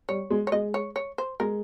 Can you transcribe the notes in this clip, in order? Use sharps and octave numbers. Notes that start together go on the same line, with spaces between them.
G3 C#5
G#3
C#5
G#3 D#5
C#5
C#5
C5
G#3 A#4